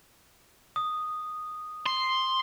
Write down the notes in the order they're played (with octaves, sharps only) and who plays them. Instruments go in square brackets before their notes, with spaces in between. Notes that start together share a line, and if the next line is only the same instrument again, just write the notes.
[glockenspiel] D#6
[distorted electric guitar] C6